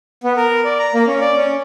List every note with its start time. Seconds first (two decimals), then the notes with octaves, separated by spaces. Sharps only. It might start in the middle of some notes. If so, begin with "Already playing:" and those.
0.24 B3
0.37 A#4
0.64 D5
0.79 A#5
0.94 A#3
1.07 C#4
1.21 D5
1.38 C#4